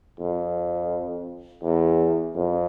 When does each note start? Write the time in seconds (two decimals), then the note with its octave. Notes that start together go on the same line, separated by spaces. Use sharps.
0.20 F2
1.63 E2
2.35 F2